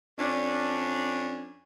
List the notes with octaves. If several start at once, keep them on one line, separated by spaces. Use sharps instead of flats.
F2 C#4 D4